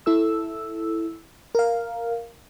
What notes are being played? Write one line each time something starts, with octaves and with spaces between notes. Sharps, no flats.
E4 A4 E6
A#4 F5